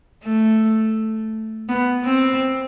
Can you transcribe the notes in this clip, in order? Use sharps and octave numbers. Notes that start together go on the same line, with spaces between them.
A3
B3
C4